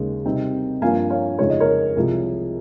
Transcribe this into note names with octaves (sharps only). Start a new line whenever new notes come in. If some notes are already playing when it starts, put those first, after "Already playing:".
Already playing: D#2 C#3 G#3
C3 G3 C4 D#4
G2 F3 A#3 C#4 F5 G#5
C#5 F5
F2 C#3 G#3 D#4 C#5
D#5
A#4 C#5
C2 C3 F3 G#3